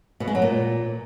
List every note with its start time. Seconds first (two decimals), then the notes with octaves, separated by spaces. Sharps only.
0.20 B2
0.28 G#3
0.35 F#3
0.42 A#2